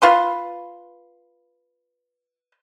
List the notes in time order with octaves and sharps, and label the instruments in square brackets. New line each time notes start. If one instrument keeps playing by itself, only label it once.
[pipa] F4 B4 C6